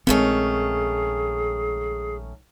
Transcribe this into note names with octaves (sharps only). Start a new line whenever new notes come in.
A#1 D#3 G#3 A3 C4 C#4 G#4